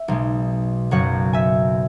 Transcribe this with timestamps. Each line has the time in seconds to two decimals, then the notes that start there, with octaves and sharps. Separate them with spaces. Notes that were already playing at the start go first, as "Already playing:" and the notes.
Already playing: E5
0.08 B1 B2 G#3
0.91 F#1 F#2 F#3 C#5 F#5
1.33 E5 G#5